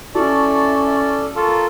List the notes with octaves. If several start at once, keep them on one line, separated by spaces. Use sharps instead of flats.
C#4 E4 F#4 A4 D5 E5 A5 C#6
F4 A4 A#4 C#6